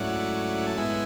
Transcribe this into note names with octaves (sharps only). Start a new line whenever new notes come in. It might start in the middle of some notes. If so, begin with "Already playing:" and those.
Already playing: G#2 F#3 A3 C#4 E4 D5 F#5
A5
G#2 G#3 B3 E4 E5 G#5